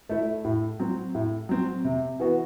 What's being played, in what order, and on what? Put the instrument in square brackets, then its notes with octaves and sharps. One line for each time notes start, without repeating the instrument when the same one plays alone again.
[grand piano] A3 E4
A2
F#3 C4
A2
F#3 C4
C3
E3 B3 F#4